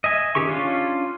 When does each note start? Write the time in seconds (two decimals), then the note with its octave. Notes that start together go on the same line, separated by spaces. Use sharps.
0.04 D#5 E5 G#5
0.35 D#3 C#4 G4 G#4 C#6
0.47 C#4 D4 F4